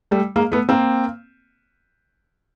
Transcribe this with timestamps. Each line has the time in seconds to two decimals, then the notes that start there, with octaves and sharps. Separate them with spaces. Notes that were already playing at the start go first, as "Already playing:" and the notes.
0.11 G3 A3
0.36 G#3 A#3
0.52 A3 B3
0.69 A#3 C4